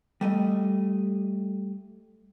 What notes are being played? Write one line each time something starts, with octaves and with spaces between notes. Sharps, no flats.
G3 A3 D#5